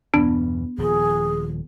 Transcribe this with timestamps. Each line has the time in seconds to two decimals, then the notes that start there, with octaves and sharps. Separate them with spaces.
0.14 E2 G2 B2 B3 D4
0.78 D#1 F3 G#4